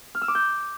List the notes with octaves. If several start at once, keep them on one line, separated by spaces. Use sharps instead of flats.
F6
E6
D6
G6